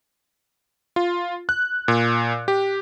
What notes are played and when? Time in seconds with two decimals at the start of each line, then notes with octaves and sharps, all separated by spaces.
0.96 F4
1.49 F#6
1.88 A#2
2.48 G4